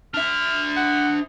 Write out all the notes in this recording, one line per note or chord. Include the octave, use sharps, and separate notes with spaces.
D4 E5 F6
F#5